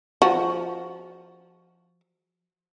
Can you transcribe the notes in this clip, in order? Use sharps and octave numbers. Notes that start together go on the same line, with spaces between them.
F3 F#4